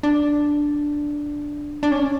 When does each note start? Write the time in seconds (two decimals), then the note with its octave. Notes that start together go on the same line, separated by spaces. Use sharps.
0.03 D4
1.83 D4
1.92 C#4